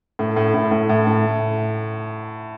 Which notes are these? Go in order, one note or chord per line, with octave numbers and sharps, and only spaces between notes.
A2
A2
A2
A2
A2
A2